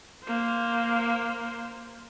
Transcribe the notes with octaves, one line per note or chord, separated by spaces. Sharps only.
A#3 C5